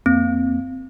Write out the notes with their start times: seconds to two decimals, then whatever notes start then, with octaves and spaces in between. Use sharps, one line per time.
0.06 F2 A#3 C4